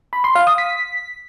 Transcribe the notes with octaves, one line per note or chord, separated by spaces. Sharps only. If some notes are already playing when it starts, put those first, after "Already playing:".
B5
C6
F5
D#6
B6